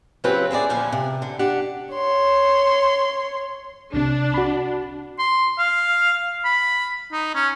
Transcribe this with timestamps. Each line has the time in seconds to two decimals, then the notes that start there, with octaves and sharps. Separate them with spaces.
0.24 C#3 F#3 C4 F4 G4 B4
0.51 C4 E4 G#4 D5
0.69 D2 A#2 F3 G3 B3 G#5
0.92 C3
1.22 D3
1.39 D4 G4 F#5
1.94 C#5 C6
3.94 C2 C3 D4
4.34 F#4 B5
5.19 C6
5.59 F5
6.45 B5
7.12 D#4
7.35 C#4